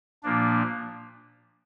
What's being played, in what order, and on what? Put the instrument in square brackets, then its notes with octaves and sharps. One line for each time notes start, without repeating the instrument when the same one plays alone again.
[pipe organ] A#2 F3 A#3 D4